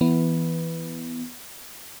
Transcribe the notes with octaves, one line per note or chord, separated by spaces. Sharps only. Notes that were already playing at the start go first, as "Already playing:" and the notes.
E3 B3